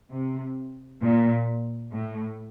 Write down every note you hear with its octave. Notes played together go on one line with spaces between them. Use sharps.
C3
A#2
A2